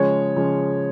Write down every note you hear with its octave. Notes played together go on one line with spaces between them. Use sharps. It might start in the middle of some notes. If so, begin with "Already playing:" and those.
Already playing: C#3 F3 G#3 C#5
C#3 F3 G#3